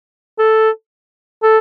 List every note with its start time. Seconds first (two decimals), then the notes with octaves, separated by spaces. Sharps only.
0.39 A4
1.43 A4